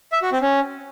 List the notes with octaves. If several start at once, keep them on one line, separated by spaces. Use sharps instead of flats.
E5
F#4
C4
C#4